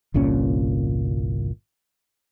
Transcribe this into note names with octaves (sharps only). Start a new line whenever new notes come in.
G1 C2 A#2 C#4